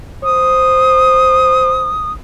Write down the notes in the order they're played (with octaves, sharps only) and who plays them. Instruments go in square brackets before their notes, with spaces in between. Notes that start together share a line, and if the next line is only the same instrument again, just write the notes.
[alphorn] C5 [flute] D#6